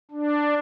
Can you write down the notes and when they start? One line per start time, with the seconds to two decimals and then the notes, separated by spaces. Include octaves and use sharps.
0.11 D4